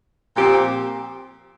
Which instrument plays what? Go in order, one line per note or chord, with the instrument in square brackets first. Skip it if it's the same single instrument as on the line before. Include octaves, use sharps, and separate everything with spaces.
[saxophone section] A#2 F3 C4 G4